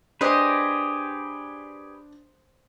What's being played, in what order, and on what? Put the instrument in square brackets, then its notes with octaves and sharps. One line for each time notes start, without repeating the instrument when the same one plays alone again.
[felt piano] D4 [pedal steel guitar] G4 G#4 B4 [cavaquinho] C5 D#5